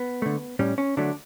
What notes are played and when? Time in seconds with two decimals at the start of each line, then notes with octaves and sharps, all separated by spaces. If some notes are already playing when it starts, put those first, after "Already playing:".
Already playing: B3
0.22 D3 A3
0.59 A2 G3 C#4
0.78 C#4
0.97 D3 F#3 A3 D4